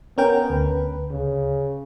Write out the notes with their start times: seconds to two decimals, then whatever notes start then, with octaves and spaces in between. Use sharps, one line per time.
0.18 B3 C#4 A#4 G5
0.50 D2 B4
1.10 C#3